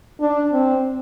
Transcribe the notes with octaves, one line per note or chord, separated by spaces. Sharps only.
D4
C4